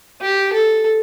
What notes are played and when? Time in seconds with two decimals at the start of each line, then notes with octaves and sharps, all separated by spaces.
0.22 G4
0.53 A4